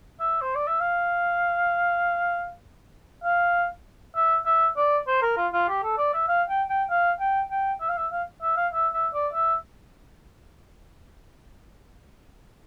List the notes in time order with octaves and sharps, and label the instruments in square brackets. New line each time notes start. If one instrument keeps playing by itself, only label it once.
[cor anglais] E5
C5
D5
E5
F5
F5
E5
E5
D5
C5
A#4
F4
F4
G4
A4
D5
E5
F5
G5
G5
F5
G5
G5
E5
F5
E5
F5
E5
F5
E5
E5
D5
E5